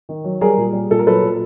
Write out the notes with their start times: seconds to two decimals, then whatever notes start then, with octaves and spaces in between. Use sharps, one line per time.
0.09 D#3
0.24 F#3
0.41 G3 G#4 A#4
0.57 A#2
0.73 G3
0.90 A#2 A4
0.99 A#4
1.07 F#3 A4 B4
1.23 A#2